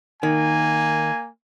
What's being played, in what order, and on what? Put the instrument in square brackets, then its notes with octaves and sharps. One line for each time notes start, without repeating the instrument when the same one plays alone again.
[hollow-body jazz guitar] D#3 [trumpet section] A#3 G#5